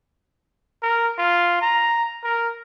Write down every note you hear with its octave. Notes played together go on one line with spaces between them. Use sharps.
A#4
F4
A#5
A#4